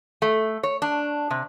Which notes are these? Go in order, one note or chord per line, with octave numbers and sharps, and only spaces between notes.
A3
C#5
D4
C3